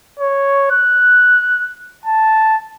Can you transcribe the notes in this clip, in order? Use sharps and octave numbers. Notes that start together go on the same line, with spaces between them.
C#5
F#6
A5